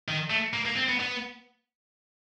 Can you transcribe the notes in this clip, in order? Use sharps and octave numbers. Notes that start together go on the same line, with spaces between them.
D#3
A3
A#3
A#3
C4
B3
B3